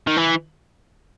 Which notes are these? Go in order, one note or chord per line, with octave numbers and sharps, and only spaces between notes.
D#3
E3